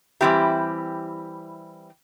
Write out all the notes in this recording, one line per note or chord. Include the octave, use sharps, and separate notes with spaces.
E3 G3 C4 E4 G4